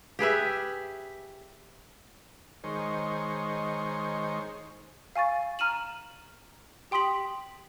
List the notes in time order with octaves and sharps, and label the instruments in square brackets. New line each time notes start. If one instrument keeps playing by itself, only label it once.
[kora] G4 G#4 B4 E5
[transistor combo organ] D#3 G#3 C5 C#5
[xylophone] F5 G#5 C#6 A6
A#5 F6 D#7 E7 F#7
G4 G5 C6 D#6 B6 F#7